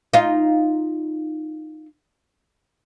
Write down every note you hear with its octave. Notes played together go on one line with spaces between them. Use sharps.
D#4 F4